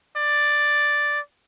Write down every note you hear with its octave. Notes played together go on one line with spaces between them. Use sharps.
D5